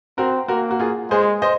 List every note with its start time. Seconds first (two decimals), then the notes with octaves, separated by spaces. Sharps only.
0.18 C4 F#4 A#4
0.48 A#3 F#4 A#4
0.71 F#4
0.79 F4 G#4
1.11 G#3 G#4 C5
1.42 C5 D#5